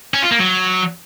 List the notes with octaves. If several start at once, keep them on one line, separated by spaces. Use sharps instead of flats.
C#4
F4
A#3
F#3